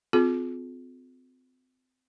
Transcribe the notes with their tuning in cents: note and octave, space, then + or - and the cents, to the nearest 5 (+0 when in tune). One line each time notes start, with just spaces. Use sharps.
C4 -30 F4 +25 G#4 +35